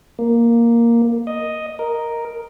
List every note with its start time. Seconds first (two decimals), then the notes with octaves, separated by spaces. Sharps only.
0.19 A#3
1.27 D#5
1.79 A#4